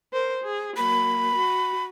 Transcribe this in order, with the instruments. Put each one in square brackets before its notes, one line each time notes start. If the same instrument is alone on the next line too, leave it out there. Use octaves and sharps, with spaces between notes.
[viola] A#4 C5
G#4
[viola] F#3 A#3 [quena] B5
[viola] F#4